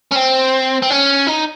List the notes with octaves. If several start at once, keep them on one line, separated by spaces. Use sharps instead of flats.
C#4
C4
C4
C#4
D#4